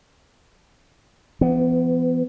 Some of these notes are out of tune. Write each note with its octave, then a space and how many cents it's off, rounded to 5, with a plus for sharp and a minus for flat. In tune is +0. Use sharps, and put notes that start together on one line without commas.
E3 +45 B3 +25